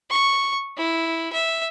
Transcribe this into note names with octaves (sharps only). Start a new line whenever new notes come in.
C#6
E4
E5